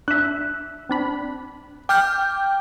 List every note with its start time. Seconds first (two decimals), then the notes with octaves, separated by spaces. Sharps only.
0.08 D4 E5 F#6
0.89 C4 D4 B5
1.89 G5 D6 F6 G6